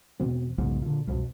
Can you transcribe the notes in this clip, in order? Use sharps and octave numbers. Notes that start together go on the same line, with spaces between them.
E2 B2 C4
B1 E2 G#2 C#3
A#2 D3
C2 F2 B2